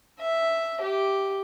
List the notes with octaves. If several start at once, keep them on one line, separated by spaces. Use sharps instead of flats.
E5
G4